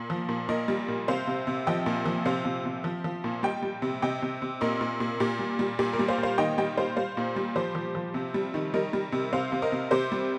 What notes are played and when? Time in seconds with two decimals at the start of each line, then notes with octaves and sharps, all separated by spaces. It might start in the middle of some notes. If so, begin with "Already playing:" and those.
Already playing: A#2
0.10 F3
0.29 A#2
0.49 A#2 A#4 D#5
0.68 G3
0.88 A#2
1.08 C3 C5 F5
1.27 C3
1.47 C3
1.67 F3 D#5 G5
1.86 A#2
2.05 F3
2.25 C3 C5 F5
2.45 C3
2.65 C3
2.84 F3
3.04 F3
3.24 A#2
3.43 G3 D#5 G5
3.62 G3
3.82 C3
4.02 C3 D#5 G5
4.22 C3
4.42 C3
4.61 A#2 A#4 D#5
4.81 A#2
5.00 A#2
5.20 A#2 G4
5.39 G3
5.59 G3
5.79 A#2 G4
5.93 A#4
5.99 G3
6.08 C5 F5
6.18 A#2
6.23 C5 F5
6.38 D#3 D#5 G5
6.58 G3 D#5 G5
6.77 G3 C5 F5
6.97 G3 C5 F5
7.17 A#2
7.36 G3
7.56 F3 G4 C5
7.75 F3
7.95 F3
8.14 C3
8.34 G3
8.54 D#3
8.74 G3 A#4 D#5
8.93 G3
9.12 C3
9.32 C3 C5 F5
9.52 C3
9.62 A#4 D#5
9.72 C3
9.91 C3 G4 C5
10.12 G3